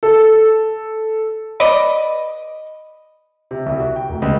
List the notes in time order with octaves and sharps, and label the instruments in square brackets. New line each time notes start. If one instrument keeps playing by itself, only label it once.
[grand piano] A4
[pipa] B4 D5 D#5
[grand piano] C3
C2
F#4
G5
F1
C#2